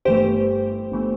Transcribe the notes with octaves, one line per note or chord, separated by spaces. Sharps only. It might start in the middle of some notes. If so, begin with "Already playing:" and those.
G1 G2 E3 A3 G4 C5
G1 E3 A3